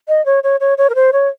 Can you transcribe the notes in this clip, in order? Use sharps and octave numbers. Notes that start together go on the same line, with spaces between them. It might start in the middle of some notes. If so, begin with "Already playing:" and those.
D#5
C#5
C#5
C#5
C#5
A#4
C5
C#5